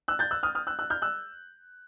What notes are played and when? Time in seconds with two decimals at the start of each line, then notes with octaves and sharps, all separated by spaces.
0.08 E6 F#6
0.19 G6 A6
0.31 E6 F#6
0.43 D#6 F6
0.55 D#6 F6
0.67 E6 F#6
0.79 E6 F#6
0.90 F6 G6
1.02 E6 F#6